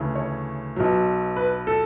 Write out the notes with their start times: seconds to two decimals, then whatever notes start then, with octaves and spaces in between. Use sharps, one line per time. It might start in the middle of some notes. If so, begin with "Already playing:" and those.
Already playing: D2 C#3 E3 A3
0.15 C#5
0.76 B1 B2 F#3
1.36 B4
1.67 A4